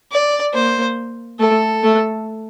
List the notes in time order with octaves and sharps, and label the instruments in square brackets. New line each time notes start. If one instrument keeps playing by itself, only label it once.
[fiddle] D5
[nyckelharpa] A#3 [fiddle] C5
[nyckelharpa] A3 [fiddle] A4
[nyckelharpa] A3